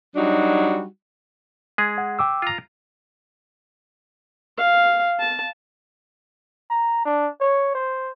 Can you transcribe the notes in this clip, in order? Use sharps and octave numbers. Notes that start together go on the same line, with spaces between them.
F#3 G3 D4 D#4 F#4
G#3 G#4
F#5
G5 D6 E6
F4 A#5
F5
A5
A#5
D4
C#5
C5